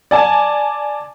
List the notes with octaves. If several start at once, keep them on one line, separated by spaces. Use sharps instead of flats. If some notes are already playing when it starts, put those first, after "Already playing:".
D5 G#5 A5